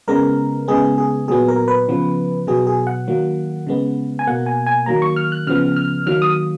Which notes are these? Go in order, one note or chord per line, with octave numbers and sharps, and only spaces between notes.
C#3 G#3 B3 A#4
C#3 G#3 B3 G#4
G#4
A#2 F#3 B3 G#4
A#4
B4
C#3 F3 B3
B2 F#3 B3 G#4
G#4
F#5
D#3 F#3 A#3
C#3 G#3 B3
G#5
B2 A#3 F#5
G#5
G#5
D#3 F#3 A#3 A#5
C#6
F6
F#6
C#3 F3 B3 F6
F6
D#3 F#3 A#3 F6
D#6